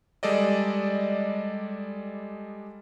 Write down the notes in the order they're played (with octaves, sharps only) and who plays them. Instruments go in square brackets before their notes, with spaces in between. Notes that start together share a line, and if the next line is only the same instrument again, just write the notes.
[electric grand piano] G3 G#3 A4 D5 D#5